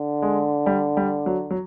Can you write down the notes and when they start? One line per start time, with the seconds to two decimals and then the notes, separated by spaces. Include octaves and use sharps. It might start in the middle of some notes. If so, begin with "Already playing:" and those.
Already playing: D3
0.22 G#3
0.66 G3
0.97 G3
1.26 F#3
1.50 F#3